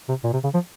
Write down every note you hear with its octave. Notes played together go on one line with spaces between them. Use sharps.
C3
A#2
C3
C#3
F3